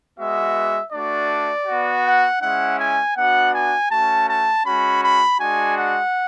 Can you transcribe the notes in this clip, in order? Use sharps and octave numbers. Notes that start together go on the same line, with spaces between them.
G#3 B3 F#4 E5
A3 D4 F#4 D5
B3 F#4
F#5
G#3 C#4 E4 F#5
G#5
B3 D4 F#4 F#5
G#5
A3 C#4 F#4 A5
A5
G#3 C#4 F#4 B5
B5
G#3 D4 F#4 G#5
F#5